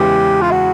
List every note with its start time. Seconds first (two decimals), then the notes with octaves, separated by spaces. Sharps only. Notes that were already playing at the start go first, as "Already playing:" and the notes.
Already playing: E2 C#3 E3 G#3 B3 G4
0.41 F4
0.51 F#4